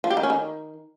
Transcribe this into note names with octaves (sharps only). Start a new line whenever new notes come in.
F3
G4
D#3
C#4
D#3